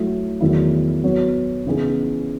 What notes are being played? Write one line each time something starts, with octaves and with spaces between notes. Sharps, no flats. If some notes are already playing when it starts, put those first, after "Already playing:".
Already playing: F#3 A3 E4
E2 D#3 F#3 A3 E4
F#3 B3 F#4 C#5
C#3 E3 B3 D#4 G#4